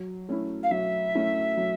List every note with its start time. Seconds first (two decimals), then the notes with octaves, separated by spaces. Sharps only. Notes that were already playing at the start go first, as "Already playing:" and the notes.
Already playing: F#3
0.29 A3 C#4 E4
0.63 F5
0.71 F#3 E5
1.15 A3 C#4 E4
1.57 F#3